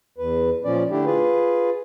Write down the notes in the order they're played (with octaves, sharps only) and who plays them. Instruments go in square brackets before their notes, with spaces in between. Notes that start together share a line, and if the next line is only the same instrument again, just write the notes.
[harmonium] E2 B4
A#2 F3 C#4 D5
D3 A3 D4 E4 G4
F4 G#4 B4